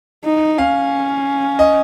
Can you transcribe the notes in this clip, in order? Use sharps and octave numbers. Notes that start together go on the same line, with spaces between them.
D#4
C#4 F5
D#5